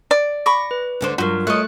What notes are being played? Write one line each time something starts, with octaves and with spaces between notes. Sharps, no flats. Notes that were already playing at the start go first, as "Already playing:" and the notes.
D5
B5 C#6 D6 A#6
B4
D2 D3 C5
G2 F#3 F4 F#4 A#4
A3 C#5 D#5 F#6